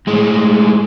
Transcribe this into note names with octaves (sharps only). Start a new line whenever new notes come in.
A2 G#3